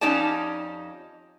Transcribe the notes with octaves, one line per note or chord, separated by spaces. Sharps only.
F2 C#4 D#4 G4 D5 A5